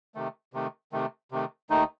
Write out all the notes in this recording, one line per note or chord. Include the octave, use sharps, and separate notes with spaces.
C3 D#3 A3
C3 D#3 A3
C3 D#3 A3
C3 D#3 A3
D#2 D#3 A3 D#4